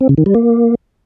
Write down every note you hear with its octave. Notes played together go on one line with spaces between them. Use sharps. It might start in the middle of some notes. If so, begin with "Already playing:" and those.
C4
C#3
D#3
G3
A#3